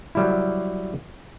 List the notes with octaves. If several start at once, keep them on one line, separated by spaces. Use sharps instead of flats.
F#3 G3 E4